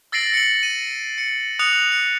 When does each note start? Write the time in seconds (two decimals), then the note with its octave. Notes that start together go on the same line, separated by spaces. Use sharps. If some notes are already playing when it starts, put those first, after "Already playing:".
0.12 E6 A6 A#6 C7 D7 F#7
0.34 C#7 F#7
0.63 D#7
1.18 C#7
1.59 D#6 F#6 C#7 F7
1.92 C#7